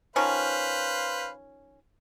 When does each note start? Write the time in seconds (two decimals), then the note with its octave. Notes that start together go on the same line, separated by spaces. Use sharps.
0.16 D#3 F3 C#4 B4 C5 F5